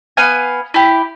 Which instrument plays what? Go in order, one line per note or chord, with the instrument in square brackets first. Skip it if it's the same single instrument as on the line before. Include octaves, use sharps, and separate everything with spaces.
[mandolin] B3 F5 G#5
E4 G4